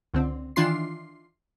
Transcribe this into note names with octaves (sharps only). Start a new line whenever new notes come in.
C#2 D3 C4
D#3 E3 D4 F4 C6 C7